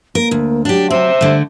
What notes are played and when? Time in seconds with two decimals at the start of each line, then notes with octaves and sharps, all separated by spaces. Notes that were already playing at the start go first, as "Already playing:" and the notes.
0.15 A#3 A#4
0.31 D2
0.65 F#3 D4 G4
0.91 C4 C5 E5
1.21 D3 G3 A3